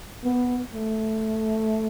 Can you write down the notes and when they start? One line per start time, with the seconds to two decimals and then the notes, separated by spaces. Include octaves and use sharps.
0.24 B3
0.72 A3